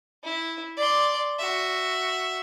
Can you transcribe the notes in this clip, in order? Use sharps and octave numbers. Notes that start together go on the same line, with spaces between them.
E4
D5 C6
F#4 E5